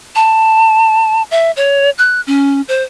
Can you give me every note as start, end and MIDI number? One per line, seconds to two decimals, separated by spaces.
0.15 1.22 81
1.31 1.51 76
1.57 1.90 73
1.98 2.21 90
2.27 2.61 61
2.68 2.83 72